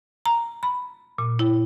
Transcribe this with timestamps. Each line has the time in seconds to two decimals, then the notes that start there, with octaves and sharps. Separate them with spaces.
0.26 A#5
0.63 B5
1.18 A#2
1.39 E4